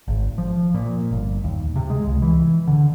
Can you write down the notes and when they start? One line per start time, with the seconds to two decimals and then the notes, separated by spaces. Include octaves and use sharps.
0.08 G#1
0.38 F3
0.75 A#2
1.11 G1
1.44 D#2
1.76 C3
1.90 G#3
2.07 C#2
2.22 E3
2.67 D3